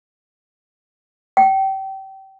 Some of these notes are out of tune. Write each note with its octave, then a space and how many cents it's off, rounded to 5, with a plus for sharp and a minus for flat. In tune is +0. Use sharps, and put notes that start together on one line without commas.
G5 -30